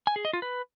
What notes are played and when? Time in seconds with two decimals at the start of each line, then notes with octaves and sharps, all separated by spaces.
0.07 G#5
0.16 G#4
0.25 D#5
0.33 F4
0.42 B4